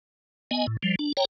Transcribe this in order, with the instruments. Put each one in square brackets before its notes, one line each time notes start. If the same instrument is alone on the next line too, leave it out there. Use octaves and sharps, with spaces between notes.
[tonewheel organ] B3 D#5 G#5
A2
F3 G3
D4
C#5 G5 A#5